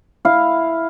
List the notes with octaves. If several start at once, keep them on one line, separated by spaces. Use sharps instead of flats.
E4 F5